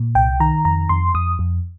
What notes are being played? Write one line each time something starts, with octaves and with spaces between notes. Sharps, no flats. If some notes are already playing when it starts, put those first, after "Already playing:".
Already playing: A#2
C2 G5
D#3 A#5
F2 A#5
F2 C6
F2 D#6
F2